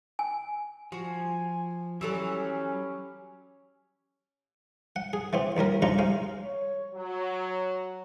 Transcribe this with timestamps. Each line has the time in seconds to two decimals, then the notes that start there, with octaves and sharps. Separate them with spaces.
0.19 G#5
0.92 F3 F#4 G#5
2.01 E3 F#3 C#4 G4 A4 E6
4.96 F#5
5.13 G#4
5.33 E3 B3 C4
5.57 A1 D#2 G3 A#4
5.82 C2 G#2 D4 F4 A#5 C#6
5.99 C3 G#3 F5
6.43 C#5
6.95 F#3